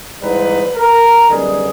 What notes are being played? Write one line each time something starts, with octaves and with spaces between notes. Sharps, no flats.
G#2 E3 G3 C4 D#4 B4
A#4
F#2 D3 G3 B3 D#4 G#4